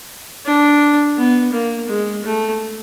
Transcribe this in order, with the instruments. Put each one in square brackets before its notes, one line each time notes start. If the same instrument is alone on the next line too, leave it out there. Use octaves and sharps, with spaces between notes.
[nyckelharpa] D4
B3
A#3
G#3
A3